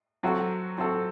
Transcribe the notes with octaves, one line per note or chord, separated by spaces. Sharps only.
F#3 C4 F#4 A4
F#3 C4 F#4 A4